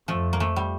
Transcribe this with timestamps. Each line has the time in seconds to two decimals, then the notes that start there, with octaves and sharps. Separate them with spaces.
0.08 F2 F3 A3
0.33 A#3
0.40 F3 A3
0.56 G3